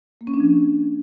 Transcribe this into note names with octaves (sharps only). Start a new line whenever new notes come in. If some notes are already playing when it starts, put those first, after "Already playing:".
A#3
C#4
D4
F3